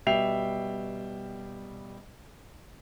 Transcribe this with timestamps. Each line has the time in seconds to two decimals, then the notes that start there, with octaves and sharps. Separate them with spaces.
0.06 B2 G3 E5 G5 C7 F7